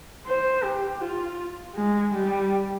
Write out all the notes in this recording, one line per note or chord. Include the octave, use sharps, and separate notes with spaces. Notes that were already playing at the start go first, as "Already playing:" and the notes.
C5
G4
F4
G#3
G3